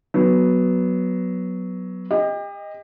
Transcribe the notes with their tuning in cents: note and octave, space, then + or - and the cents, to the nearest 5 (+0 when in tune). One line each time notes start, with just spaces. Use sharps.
F#3 +0 B3 +0
G4 +35 D#5 +0